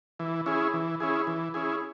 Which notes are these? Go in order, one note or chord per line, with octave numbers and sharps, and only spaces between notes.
E3
C#4 E4 G#4
E3
C#4 E4 G#4
E3
C#4 E4 G#4